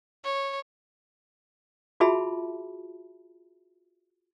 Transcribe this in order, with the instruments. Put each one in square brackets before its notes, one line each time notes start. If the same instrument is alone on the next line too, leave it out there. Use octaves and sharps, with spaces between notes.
[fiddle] C#5
[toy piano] F4 F#4 G#4 E5 A5 B5